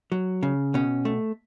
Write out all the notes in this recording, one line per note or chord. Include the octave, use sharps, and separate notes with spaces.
F#3
C#3
B2 C#4
A3